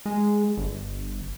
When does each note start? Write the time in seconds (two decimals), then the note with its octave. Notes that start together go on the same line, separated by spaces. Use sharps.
0.06 G#3
0.57 G1